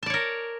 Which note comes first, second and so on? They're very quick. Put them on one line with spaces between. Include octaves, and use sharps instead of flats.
A5 D5 C#5 A#4